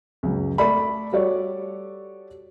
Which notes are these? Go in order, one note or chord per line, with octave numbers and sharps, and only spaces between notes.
C#2 F#2
A3 A4 D5 B5
G3 F#4 A4 C#5 D5